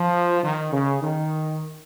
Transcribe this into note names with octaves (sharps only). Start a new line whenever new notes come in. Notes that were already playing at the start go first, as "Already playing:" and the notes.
Already playing: F3
D#3
C#3
D#3